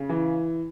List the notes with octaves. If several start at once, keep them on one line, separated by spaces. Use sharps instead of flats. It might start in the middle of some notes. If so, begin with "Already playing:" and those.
Already playing: C#3
E3